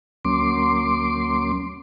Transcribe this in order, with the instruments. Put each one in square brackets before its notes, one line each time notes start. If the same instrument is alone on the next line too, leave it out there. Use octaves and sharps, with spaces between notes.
[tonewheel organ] D2 F#3 A#3 C#4 C6 D6